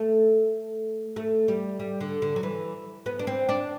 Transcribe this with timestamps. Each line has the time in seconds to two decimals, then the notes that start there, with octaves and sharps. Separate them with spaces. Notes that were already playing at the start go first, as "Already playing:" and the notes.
Already playing: A3
1.16 A3
1.48 G3
1.79 G3
2.00 D3
2.22 D3
2.36 F#3
2.43 E3
3.06 B3
3.19 D4
3.27 C4
3.49 D4